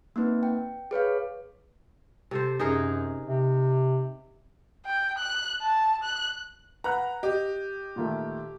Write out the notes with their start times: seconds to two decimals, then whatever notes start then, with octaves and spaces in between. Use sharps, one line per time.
0.16 A#3 C4 D#4 B4
0.43 G5
0.91 G#4 B4 C#5 F5
2.31 C3 A4 C5
2.60 F#2 D#4 G#4 A#4
3.26 C3
4.86 G5
5.18 F#6
5.62 A5
6.03 F#6
6.84 B4 F#5 A#5 F#6
7.23 G4 D#5
7.96 A#2 D#3 A3